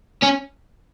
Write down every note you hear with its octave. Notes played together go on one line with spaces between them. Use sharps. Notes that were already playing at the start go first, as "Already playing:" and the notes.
C#4